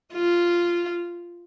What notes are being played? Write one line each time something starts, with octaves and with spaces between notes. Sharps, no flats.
F4